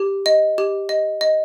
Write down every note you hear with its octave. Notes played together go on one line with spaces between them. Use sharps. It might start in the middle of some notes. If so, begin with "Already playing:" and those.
Already playing: G4
D#5
G4
D#5
D#5